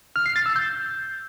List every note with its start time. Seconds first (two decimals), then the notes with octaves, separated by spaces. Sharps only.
0.16 F6
0.26 C7
0.36 A6
0.46 E6
0.56 G6